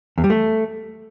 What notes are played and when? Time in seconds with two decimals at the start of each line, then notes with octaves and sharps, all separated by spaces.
0.18 E2
0.24 G3
0.30 A3